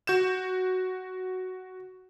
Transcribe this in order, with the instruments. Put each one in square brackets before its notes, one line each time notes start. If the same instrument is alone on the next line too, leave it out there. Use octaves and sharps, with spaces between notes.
[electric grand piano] F#4 G6 E7